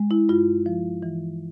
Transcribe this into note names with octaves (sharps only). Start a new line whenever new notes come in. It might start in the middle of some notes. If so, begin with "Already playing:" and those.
Already playing: G#3
E4
G2 F4
F3
E3